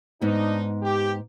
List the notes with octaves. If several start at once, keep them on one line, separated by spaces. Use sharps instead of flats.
G#2 B3 D4 D#4
G4